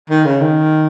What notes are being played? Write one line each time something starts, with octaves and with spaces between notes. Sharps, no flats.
D#3
C#3
D#3